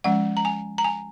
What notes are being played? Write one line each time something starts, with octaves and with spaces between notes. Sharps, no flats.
F3 G#3 C#4 F#5
A#5
G#5
A#5
G#5